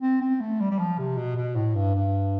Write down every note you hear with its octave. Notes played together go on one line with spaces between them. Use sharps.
C4
C4
A3
G3
G3
F3
C3
B2
B2
A2
G2
G2